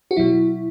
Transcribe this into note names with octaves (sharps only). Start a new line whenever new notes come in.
F#4
B2 F#3 E4